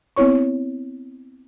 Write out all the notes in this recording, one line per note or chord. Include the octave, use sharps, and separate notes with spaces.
B3 C4 E4 C#5 C#6